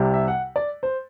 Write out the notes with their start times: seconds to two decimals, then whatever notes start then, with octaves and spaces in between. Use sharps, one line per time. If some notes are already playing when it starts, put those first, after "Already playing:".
Already playing: C2 C3 G3
0.14 E5
0.28 F#5
0.56 D5
0.83 C5